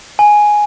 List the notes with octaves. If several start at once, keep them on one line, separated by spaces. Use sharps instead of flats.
G#5